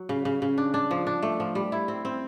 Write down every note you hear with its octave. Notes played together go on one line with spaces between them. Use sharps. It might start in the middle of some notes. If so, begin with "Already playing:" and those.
Already playing: F#3
C#3
C#3
C#3
D4
D4
F3
D4
A3
F3
G3
E4
C4
C4